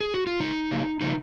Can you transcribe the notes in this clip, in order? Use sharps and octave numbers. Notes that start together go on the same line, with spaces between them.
G#4
F#4
F4
C#3 G#3 D#4
C#3 F#3 A#3
C#3 F3 A#3 D#4